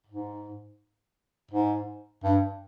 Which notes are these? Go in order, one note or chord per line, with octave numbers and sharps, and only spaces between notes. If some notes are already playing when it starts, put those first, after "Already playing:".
G#2
G#2
G2